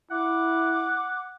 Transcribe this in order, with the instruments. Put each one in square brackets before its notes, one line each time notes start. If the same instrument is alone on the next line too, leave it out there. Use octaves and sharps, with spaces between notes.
[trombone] E4 [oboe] F#5 [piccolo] D6